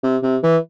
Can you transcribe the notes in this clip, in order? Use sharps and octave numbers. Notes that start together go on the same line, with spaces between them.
C3
C3
E3